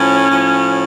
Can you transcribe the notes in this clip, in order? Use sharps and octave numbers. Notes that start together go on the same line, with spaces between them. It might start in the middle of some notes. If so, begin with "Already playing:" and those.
Already playing: A2 F3 C#4
A2 F3